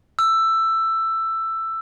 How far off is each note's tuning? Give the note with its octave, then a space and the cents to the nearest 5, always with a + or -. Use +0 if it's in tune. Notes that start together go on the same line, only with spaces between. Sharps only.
E6 +10